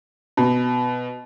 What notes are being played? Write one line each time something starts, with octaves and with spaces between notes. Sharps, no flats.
B2